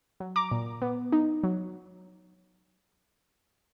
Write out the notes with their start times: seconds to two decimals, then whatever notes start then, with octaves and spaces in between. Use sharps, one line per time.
0.20 F#3
0.36 A#5 D6
0.51 A#2
0.82 B3
1.12 D#4
1.43 F#3